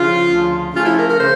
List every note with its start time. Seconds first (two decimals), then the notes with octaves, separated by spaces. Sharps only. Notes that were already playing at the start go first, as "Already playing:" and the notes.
Already playing: C#3 F3 F4
0.28 D2 C#3 F3
0.74 C#3 F3 A3 C#4 F4
0.85 E4
0.98 A#4
1.08 A#4
1.19 C#3 C5